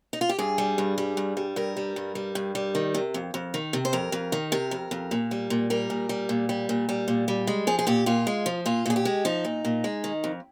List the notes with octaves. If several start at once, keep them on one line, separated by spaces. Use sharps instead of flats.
D#4
F4
G4
G2 G#4
G3
G2
G3
G2
G3
G2 A#4
G3
G2
G3
G2
G3
D#3
C3
F2
F2
D#3
C3
C5
F2 A#4
F2
D#3
C3 A#4
F2
F2
A#2
G3
A#2
G3 A#4
A#2
G3
A#2
G3
A#2
G3
A#2
G3
G#3
F3 G#4
G#4
A#2 G4
A#2 F4
G#3
F3
A#2 F4
A#2 G#4
G4
G#3
F3 D#4
A#2
A#2
G#3
D#3
F2